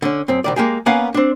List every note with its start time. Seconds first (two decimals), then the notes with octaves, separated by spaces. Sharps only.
0.02 D3 C#4
0.28 F#2 C4
0.44 C2 D#3 D5
0.56 G#3 A#3 G4 G#4
0.86 A#3 B3 C#4 F5 F#5 G#5
1.14 C4 D4